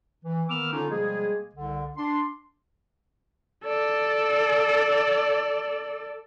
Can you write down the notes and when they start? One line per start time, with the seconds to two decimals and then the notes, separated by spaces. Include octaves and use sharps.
0.25 E3
0.50 D#3 A#3 B3 D6 E6 F6
0.72 D3 C#4 D#4 F4
0.90 B2 F3 G3 G#3 A#3 G#4
1.55 C2 D3
1.97 D4 C6
3.64 A4 D5